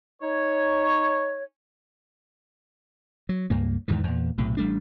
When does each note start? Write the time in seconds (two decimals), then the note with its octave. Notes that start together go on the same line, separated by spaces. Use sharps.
0.22 D#4 C#5
3.29 F#3
3.50 C#2 G2 A#3
3.88 E2 G#2 D#3 E3
4.04 E2 A#2
4.38 B1 A2 C3
4.57 A1 G3 A3 D4